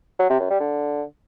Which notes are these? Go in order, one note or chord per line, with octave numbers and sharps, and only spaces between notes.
F#3
C3
F#2
G3
D3